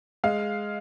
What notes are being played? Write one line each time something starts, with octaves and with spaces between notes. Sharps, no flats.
G#3 F5